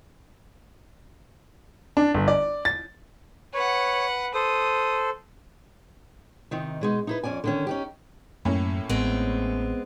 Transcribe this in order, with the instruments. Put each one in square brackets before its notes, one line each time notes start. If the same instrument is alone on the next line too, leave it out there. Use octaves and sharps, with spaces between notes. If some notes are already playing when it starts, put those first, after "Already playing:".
[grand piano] D4
G1
D5
A6
[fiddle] B4 F#5 [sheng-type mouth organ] C#5
[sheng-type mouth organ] A4 C5 [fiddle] D#6
[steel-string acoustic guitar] C3 D#3 D#4
B2 G#3 D#4
D#4 E4 B4
F2 G#2 C#4 D5 G#5
D3 D#3 C#4
C#4 D#4 G4
[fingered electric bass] F#2 [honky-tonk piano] A2 A#3 C#4
[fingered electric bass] A1 [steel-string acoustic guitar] G#3 B3 C4